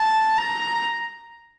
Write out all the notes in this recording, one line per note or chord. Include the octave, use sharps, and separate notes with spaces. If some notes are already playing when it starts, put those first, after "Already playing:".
Already playing: A5
A#5